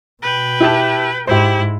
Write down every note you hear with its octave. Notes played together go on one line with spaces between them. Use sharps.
B2 B4 G5
E4 G4 A5
G#2 E4 G4 C5